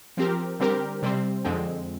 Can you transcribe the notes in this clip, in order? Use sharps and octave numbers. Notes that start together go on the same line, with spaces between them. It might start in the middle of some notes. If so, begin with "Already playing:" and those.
F3 C4 G4 A#4
D3 G3 C4 G4 A#4
C3 G3 C4
F2 D3 G#3 C4